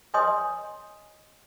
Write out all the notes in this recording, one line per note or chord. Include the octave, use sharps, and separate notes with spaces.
B4 C#5 D#5 G#5 C6 D#6